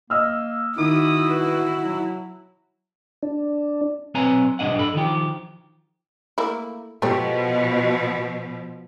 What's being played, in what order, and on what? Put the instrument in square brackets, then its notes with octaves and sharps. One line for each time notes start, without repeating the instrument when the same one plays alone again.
[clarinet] A#3 [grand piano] D#5 E6 F6
[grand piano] D#3 [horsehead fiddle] E4 F#4 [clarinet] D#6
[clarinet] B4
F#3
[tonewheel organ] D4
[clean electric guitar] B1 C4 B4 C#5 G#5 A#5
B1 G2 G3 D4 D#5 F#5
A4 B5
D#3 F3 G4
[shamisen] A3 A#3 E4
[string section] B2 F3 [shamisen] G4 A4 C#5